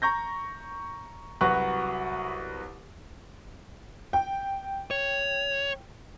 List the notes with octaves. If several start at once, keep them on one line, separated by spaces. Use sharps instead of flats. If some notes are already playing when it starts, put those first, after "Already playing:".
A#5 C#6 G6 A#6
C2 F#3 F#4 B4 F#5 C#6
G5
C#5